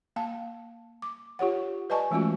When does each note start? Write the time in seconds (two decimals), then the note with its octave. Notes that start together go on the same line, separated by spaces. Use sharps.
0.16 A#3 F5 A5
1.02 D6
1.39 F4 G4 C#5 F#5
1.90 B4 D5 D#5 G#5 A5 C#6
2.11 E3 G#3 A3 C#4 F4 F#4